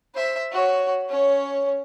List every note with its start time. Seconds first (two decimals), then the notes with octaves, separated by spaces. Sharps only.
0.14 C5 E5
0.52 F#4 C#5
1.08 C#4 C#5